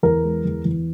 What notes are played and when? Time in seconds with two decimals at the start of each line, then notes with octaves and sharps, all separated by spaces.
0.03 E2 A#4
0.24 G#3
0.45 E2
0.65 E2